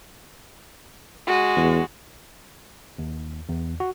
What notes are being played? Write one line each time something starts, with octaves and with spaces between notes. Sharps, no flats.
G#3 F#4
E2
D#2
E2
F#4